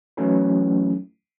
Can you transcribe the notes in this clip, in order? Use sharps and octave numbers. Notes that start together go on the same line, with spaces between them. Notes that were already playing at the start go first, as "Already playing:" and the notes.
E3 F#3 A3 C#4 D#4 E4